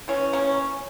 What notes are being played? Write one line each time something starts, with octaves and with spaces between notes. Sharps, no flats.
E3 C#4
A#3 C#4